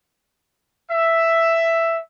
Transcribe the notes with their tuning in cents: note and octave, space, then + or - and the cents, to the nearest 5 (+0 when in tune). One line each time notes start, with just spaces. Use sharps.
E5 +5